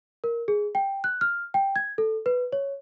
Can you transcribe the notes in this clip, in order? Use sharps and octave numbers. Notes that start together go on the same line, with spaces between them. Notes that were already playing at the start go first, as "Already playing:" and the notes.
A#4
G#4
G5
F#6
F6
G5
G#6
A4
B4
C#5